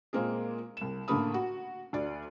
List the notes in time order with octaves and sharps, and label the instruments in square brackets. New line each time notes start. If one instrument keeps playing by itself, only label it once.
[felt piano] A#2 G#3 A#3 C4 G#4
C2 E7
A1 D3 A3 A#3 B5 D#6
F#4
D2 D5